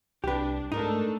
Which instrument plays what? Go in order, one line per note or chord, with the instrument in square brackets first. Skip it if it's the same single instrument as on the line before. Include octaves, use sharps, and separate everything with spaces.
[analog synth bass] C2 [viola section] D4 [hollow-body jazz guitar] G4 B4
[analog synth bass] G#2 [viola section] A3 D4 A4 [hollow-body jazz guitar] D#4 A#4